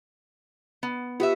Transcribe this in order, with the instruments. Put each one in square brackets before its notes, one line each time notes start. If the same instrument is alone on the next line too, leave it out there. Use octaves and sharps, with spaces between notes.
[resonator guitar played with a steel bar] B3
[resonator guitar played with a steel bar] B3 B4 E5 [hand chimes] F4 G4